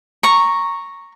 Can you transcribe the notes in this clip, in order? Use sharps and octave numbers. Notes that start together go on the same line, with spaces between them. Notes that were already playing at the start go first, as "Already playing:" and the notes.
A#5 C#6